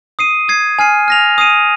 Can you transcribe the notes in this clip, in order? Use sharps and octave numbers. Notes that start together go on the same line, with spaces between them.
D#6 C7 D#7
D#6 G#6 C7
G#5 F6 C7 D#7
F6 A#6 F7
D#6 C7 D#7